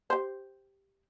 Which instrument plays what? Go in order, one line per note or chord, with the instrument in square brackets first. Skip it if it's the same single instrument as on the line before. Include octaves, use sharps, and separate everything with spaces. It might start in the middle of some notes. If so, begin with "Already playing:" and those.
[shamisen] G4 C5